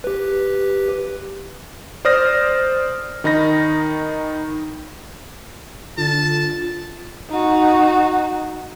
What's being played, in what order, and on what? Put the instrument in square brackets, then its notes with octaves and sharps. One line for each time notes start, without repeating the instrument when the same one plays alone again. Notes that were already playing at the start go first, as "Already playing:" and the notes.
[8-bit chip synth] G4 B4
[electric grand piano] C5 D5 D#6 F6 A#6
D#3 D#4 B5 A#6
[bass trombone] D3 [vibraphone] F4 [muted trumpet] A5
[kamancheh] D#4 F#4